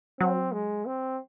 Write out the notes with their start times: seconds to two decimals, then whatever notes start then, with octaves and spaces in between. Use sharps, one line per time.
0.20 F#3 C4
0.52 G#3
0.86 C4